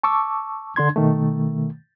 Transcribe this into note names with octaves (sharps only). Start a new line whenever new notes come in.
A5 C#6 D6 E6
D3 D4 C6 G#6
B2 D#3 A3